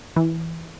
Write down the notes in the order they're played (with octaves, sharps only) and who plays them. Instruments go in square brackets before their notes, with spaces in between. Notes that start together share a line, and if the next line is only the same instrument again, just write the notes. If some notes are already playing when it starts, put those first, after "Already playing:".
[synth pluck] E3